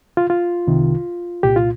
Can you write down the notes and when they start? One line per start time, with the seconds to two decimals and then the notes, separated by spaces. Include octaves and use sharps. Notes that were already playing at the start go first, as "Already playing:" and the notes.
0.17 F4
0.30 F4
0.67 C2 C3 D#3
1.43 C2 A#2 G4
1.56 F4